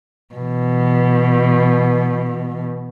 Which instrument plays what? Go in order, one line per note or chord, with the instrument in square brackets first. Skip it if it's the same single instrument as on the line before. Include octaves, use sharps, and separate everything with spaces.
[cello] B2 E3